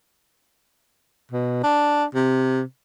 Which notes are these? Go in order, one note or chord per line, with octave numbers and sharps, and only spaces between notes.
B2
D4
C3